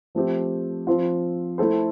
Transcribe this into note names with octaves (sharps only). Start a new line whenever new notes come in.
F3 A3 C4 G4
F3 C4 F4
A3 E4 A4 C5